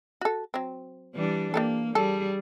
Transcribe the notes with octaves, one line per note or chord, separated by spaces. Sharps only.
F#4 A4
F#3 C4
E3 G3 D4
A#3 D4 G4 A4
G3 G#4 A4